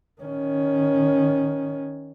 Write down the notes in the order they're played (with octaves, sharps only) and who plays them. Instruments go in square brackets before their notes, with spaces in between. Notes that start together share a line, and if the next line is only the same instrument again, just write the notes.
[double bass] D#3 C#4